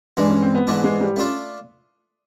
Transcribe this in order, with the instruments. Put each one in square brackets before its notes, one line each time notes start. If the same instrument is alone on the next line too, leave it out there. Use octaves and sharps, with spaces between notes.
[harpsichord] G2 E3 G#3 [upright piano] D4
[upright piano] C#4
C4
B3
[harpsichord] G#2 E3 A3 D4 [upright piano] B3
[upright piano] G#3
G3
[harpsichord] A3 D4 F4 A4 [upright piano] C#4